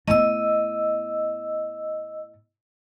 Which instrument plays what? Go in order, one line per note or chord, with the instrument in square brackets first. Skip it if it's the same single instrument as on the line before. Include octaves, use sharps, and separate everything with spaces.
[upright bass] A2 B3 [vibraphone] D#5 E6